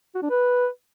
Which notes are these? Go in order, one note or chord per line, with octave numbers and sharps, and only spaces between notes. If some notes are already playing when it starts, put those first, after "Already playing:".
F#4
D4
B4